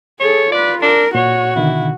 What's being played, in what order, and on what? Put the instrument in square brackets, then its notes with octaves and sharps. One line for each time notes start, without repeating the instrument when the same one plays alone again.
[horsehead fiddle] G#4 A4 [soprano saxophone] C#5
[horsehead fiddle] F4 B4 [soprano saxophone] D5
[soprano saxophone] D4 [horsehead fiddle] A#4
[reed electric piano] A#2 [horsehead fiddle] F#4 [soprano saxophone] C#5
[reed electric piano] B2 D3 D#3 [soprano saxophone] E4